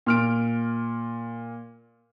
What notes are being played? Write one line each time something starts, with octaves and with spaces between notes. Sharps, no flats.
A#2 F6 D7